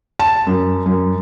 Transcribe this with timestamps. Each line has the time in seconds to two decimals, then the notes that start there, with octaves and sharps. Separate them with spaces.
0.19 A5
0.47 F#2
0.86 F#2